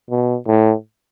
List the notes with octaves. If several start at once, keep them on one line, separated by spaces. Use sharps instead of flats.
B2
A2